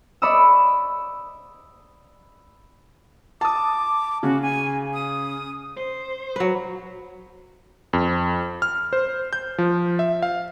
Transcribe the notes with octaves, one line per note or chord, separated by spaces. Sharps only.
D5 B5 C#6 D#6 E6
A5 D6 D#6
C#3 F#4
G#5
D#6
C5
F#3 B4
F2
F6
C5
G6
F3
E5
F5